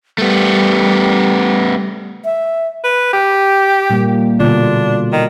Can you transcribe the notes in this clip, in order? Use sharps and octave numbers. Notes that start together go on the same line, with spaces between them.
G3 A3 B3
E5
B4
G4
A#2 G3 A#3
B2 D3 D4 F4
D#3